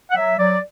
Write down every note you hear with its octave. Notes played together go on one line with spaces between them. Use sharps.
F#5
F#3 E5
F#3 D5